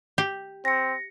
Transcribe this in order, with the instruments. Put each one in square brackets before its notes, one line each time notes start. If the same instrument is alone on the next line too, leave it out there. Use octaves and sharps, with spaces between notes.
[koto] G4
[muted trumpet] C4 [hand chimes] A#6 C#7